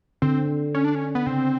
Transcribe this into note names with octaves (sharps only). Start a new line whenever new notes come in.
D3 C4
C#4
D4
C#4
B3
C#3 C4